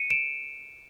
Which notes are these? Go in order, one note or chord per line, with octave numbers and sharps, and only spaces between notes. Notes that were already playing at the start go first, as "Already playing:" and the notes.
Already playing: C#7 D#7
D7 E7